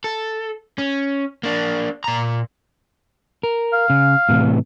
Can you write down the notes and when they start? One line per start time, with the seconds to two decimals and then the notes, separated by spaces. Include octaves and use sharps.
0.04 A4
0.78 C#4
1.43 A#3 D4
2.04 A#2 A#5
3.43 A#4
3.73 F5
3.90 C#3
4.29 A2 C3 E3